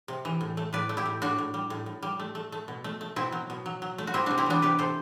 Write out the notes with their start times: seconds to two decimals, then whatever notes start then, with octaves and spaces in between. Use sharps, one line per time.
0.08 C3
0.25 E3
0.41 A2
0.57 A3
0.73 A2 B4 D5
0.89 A3
0.97 E4 G4
1.05 A2
1.22 A2 D4 F#4
1.38 A2
1.54 G3
1.70 A2
1.86 A2
2.02 G3
2.20 A3
2.35 A3
2.52 A3
2.68 B2
2.84 A3
3.01 A3
3.16 B2 C4 E4
3.32 F#3
3.50 B2
3.66 F#3
3.82 F#3
3.98 A3
4.07 F#4
4.14 G3 C4 E4
4.26 C3 D4 F#4
4.38 C4 E4
4.46 E3 B3 D4
4.62 C3 G4 B4
4.79 C3 A4 C5